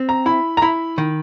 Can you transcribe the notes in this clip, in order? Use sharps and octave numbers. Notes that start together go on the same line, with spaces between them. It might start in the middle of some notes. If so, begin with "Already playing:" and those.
Already playing: C4
A#5
E4 B5
A#5
E4 B5
D#3